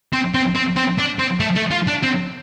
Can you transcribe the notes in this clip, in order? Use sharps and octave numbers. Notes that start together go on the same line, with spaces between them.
C4
C4
C4
C4
D4
C4
A3
A3
F4
D4
C4